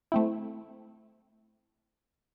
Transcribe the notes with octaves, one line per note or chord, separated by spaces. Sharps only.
A3 C4 E4